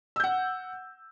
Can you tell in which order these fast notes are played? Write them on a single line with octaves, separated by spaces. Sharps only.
E6 G6 F#5